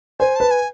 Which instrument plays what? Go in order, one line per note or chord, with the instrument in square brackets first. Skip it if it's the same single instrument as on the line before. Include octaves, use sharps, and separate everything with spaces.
[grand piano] C5 [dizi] G#5
[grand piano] B4 [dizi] A5
[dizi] G#5